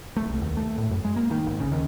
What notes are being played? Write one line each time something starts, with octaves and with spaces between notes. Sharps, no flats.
A3
C2
D#2
A3
A2
F#2
G#3
A#3
D#3
G#1
C#3
D#2